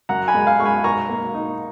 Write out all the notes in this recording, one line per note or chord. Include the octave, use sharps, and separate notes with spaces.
F#2 F#5 A#5
G#5 B5
G#3
F5 G#5
G#3 C#6
G#5 B5
B1 A#5 C#6
A#3
D#4